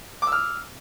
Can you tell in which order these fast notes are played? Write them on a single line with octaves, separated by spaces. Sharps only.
D6 E6 F6